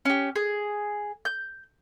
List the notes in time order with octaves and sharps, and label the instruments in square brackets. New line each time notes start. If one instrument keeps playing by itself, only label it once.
[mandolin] C#4 G4
G#4
G6